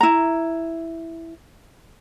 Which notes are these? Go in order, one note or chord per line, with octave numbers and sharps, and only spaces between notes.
E4 A#5